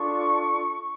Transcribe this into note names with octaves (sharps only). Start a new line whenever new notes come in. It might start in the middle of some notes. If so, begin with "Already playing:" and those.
Already playing: D4 F4 A4 C#6